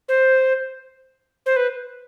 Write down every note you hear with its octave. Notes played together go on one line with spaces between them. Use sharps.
C5
C5
B4